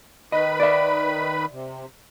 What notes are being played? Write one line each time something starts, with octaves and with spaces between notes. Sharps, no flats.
D#3 B4 D#5 B5
D5 E5
C3